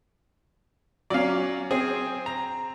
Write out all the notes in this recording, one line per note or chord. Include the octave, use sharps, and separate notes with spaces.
F#3 C#4 D5 F5
C4 G#4
A#5